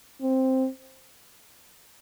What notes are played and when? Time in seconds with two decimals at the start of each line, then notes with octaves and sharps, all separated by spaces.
0.22 C4